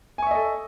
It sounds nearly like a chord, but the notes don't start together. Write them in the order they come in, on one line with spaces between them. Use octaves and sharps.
G#5 C#6 E5 D#5 A4